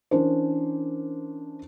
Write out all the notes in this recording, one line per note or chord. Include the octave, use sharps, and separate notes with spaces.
E3 C#4 D4 A#4 C5